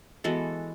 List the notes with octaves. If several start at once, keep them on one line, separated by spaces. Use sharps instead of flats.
E3 G#3 B3 F#4 A4